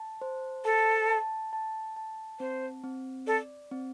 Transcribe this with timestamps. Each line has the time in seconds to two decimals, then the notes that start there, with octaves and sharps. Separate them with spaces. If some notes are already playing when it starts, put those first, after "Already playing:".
Already playing: A5
0.21 C5
0.65 A4 A5
1.09 A5
1.53 A5
1.96 A5
2.40 C4 C5
2.84 C4
3.27 A4 D5
3.71 C4